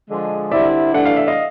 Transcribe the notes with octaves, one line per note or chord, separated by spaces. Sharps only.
D3 F3 G#3
D3 G3 C4 E4 D5 E5
G2 E3 A3 D4 F#5
F5
E5
D#5 F5